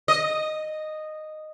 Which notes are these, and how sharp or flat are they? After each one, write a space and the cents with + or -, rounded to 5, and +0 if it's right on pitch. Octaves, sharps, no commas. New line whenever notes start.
D#5 -10